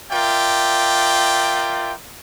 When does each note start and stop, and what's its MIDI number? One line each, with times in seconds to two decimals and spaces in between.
0.13 1.95 65
0.13 1.95 70
0.13 1.95 74
0.13 1.95 76
0.13 1.95 79